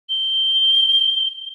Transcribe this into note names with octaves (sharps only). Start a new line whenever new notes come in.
G7